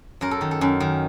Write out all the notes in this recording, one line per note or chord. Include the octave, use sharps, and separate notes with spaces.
F#2 A#4
A4
D#3
A4
F#2
D#3